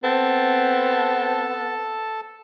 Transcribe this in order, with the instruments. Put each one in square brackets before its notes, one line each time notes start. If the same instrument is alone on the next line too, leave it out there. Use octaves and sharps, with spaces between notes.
[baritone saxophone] B3 [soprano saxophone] C4 [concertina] A4 A5